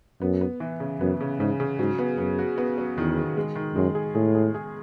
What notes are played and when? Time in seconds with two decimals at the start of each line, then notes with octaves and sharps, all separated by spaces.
0.22 F#2 B3
0.41 B3
0.60 E3
0.80 C#3
1.01 F#2 B3
1.20 C#3
1.39 G#2 C#3
1.60 C#3
1.79 G#2 F#3
1.99 B3
2.18 F#2 B3
2.38 F#4
2.58 B3
2.78 F#3
2.97 E2 D#3
3.17 D#3
3.37 G#3
3.56 D#3
3.75 F#2 G#3
3.95 G#4
4.15 A2 G#4
4.35 G#4
4.54 G#4